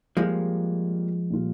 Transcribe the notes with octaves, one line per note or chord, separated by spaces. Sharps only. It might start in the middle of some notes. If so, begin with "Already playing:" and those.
F3 G3 G#3 A#3 F4
A#2 G3 A#3 F4